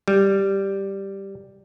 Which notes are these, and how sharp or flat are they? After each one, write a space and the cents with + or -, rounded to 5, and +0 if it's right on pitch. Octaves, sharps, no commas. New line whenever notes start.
G3 +0